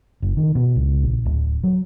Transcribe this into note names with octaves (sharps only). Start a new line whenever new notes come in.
F#1
D#3
B2
C#2
A#1
D1
F#3